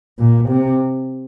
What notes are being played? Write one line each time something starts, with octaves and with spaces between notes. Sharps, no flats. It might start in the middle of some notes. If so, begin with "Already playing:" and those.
A#2
C3